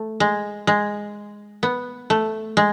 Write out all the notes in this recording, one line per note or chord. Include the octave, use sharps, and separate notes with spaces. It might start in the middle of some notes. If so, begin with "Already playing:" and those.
Already playing: A3
G#3
G#3
B3
A3
G#3